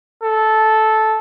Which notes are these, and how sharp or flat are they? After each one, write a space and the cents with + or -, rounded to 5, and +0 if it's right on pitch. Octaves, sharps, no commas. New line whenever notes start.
A4 -10